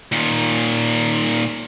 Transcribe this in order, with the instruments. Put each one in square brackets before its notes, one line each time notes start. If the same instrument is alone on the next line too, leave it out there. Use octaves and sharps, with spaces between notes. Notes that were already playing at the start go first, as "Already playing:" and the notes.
[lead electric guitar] A#2 D#3